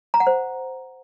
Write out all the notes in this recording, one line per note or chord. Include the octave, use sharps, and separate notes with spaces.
A#5
F#5
C5